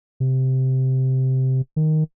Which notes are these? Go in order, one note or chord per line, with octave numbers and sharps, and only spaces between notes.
C3
D#3